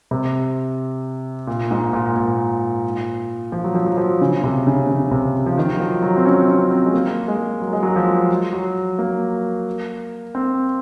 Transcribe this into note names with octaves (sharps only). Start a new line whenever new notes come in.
C3
A#2
G#2
A#2
A#2
F3
F#3
F3
F#3
F3
C#3
C3
C#3
C#3
C3
F3
D#3
F#3
F3
F#3
C4
C#4
C#4
C4
G#3
A#3
G#3
F#3
G#3
F#3
F3
F#3
A#3
C4